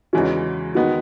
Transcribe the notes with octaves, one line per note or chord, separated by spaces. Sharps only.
E2 C#3 E3 G#3 C#4 F#4
D#3 G#3 B3 D#4 F#4